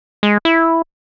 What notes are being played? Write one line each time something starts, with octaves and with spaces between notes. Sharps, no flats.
G#3
E4